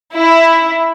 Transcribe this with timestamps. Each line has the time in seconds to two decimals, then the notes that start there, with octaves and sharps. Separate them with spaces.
0.13 E4